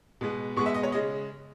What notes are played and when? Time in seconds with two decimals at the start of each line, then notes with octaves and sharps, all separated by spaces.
0.21 B2 G#3 B3
0.57 B2 G#3 B3 C#6
0.66 E5
0.74 D#5
0.83 C#5
0.92 C#3 G#3 D#5